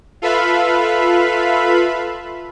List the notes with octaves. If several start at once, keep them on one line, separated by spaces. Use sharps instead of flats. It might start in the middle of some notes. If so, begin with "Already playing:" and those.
F4 A4 B4 E5 F5 B5